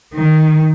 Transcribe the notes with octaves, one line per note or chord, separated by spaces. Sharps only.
D#3